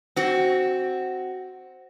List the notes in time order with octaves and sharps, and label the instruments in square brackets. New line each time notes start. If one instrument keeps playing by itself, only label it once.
[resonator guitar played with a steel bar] C4 F#4